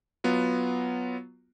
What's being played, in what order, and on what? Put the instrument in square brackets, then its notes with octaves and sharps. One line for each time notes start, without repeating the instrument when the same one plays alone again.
[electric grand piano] F#3 B3 F4